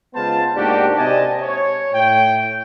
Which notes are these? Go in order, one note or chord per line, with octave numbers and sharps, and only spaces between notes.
C#3 G#3 B3 F4 C5 A5
G#2 A#3 D4 F#4 G4
C3 C4 D5 D#5 G#5 A5
C#5
A2 G5